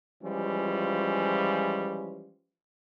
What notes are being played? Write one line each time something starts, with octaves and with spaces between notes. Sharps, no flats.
E3 F3 G3 G#3 C#4 F4